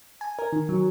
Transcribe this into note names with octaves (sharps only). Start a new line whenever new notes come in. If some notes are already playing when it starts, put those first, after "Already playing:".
G#5
A#4
D#3
F#3